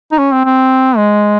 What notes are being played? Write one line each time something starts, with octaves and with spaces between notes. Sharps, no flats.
D#4
C#4
C4
C4
G#3